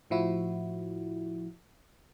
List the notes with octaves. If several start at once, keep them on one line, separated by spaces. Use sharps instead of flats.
A2 F3 E4 F#4